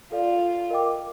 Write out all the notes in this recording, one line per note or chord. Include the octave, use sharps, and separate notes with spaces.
F4 A4 D5 F5
A#4 D#5 G5 D6